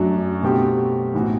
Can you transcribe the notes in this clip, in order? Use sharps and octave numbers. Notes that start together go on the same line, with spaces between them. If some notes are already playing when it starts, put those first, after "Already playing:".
Already playing: F#2 F#3 A3 D4 F#4
B2 A3 C4 G4
A1 A2 E3 B3 F#4